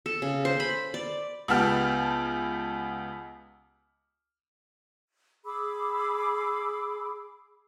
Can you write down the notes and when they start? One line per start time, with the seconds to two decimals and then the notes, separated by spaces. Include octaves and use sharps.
0.06 A4
0.22 C#3
0.45 C5
0.60 B5
0.94 D5
1.48 C#2 B3 G4 A5 F6
5.45 G#4 B5 D6 E6